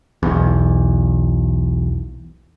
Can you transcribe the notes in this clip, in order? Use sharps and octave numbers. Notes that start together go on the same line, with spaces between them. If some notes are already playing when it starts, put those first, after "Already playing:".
B1 E2